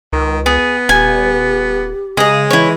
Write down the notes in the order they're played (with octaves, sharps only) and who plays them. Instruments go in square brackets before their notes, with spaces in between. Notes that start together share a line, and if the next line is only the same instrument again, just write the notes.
[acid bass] C#2 [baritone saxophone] D#3
[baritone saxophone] B3 [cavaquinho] G#4
[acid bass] D#1 [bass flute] G4 [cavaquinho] G#5
[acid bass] C#3 [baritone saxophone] G#3 [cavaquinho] G#4 D#5
[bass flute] E3 [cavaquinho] E4 C#5